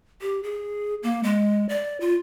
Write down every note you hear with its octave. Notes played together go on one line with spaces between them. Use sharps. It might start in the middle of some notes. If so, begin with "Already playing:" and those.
G4
G#4
A#3
G#3
D5
F4